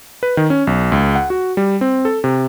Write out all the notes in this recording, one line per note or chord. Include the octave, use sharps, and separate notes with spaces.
B4
D#3
C#4
B1
C#2
F#5
F#4
G3
C4
A4
C3